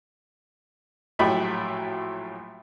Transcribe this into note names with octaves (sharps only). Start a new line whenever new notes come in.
A#1 A2 F#3 A3 G4 B5